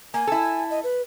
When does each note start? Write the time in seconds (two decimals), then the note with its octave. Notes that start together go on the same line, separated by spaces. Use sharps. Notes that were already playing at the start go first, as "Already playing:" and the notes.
0.14 A#3 G#5
0.27 E4 A4
0.70 D#5
0.84 B4